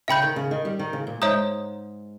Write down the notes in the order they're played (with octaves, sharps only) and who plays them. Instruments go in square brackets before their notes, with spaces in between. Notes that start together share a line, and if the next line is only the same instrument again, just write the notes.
[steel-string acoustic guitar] C#3 [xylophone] E5 G5 B5 G6
[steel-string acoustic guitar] D#3
C#3
D#3
G3
D#3
C#3
A#2
[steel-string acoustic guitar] G#2 [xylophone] C#5 E5 A#5 D#6 G6